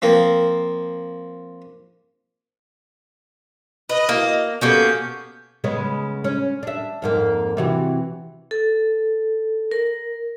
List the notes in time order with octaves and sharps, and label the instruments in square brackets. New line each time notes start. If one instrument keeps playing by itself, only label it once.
[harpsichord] F3 A#3 C4
[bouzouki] B4 [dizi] D#5
[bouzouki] A#3 [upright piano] E4 F#4
[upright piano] B2 G4 A4 [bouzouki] A#3 B3 C#4 [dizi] G6
[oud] C#3 G#3 B3
C#4
D4 E5
F2 G#2 A#3
C3 E3 F#4
[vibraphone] A4
A#4